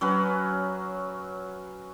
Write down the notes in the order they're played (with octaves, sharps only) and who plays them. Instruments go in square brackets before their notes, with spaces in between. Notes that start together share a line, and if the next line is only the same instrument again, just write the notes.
[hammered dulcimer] F#3 C#4 B4